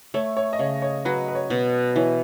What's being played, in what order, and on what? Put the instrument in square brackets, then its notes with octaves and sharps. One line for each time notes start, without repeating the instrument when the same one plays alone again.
[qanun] A3 [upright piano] C#5
[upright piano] C#5
D#5
[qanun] C#3 [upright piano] C#5
[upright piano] C#5
[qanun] F#3 [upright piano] B4
[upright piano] B4
C#5
[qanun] B2
[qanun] E3 [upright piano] C#5